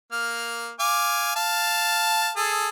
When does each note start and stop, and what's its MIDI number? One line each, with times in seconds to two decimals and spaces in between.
0.12 0.71 58
0.12 0.71 89
0.80 1.31 77
0.80 1.31 80
0.80 1.31 86
1.36 2.30 77
1.36 2.30 81
2.36 2.69 68
2.36 2.69 69